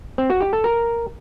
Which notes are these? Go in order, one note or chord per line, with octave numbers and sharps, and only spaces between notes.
C4
F#4
G4
A4
A#4